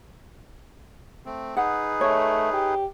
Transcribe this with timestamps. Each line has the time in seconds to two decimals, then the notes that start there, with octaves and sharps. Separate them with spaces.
1.25 A3 C4
1.57 D#4 G#4 B4 F#5
2.01 A3 C#5
2.53 G4